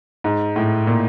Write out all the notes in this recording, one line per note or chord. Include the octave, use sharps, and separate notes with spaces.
G#2
A2
A#2